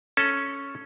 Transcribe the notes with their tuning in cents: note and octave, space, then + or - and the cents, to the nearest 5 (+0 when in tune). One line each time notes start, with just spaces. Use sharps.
C#4 +0 A4 +0